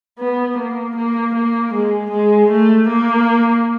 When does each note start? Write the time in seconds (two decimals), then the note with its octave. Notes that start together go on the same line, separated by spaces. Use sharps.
0.19 B3
0.57 A#3
0.97 A#3
1.34 A#3
1.74 G#3
2.11 G#3
2.51 A3
2.89 A#3